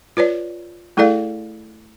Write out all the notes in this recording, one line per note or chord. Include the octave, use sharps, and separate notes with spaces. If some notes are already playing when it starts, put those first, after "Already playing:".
F4 B4 C#5 D5
A3 E4 G#4 A4 D5 F5